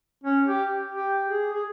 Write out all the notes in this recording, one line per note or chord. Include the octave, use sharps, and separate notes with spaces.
C#4
G4
G4
G#4
G#4